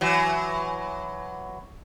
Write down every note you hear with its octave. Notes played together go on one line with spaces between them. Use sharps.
E3 F#3